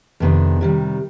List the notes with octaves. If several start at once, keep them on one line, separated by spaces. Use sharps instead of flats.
F2 C3 D#3 B3 D4
C3 D#3 G3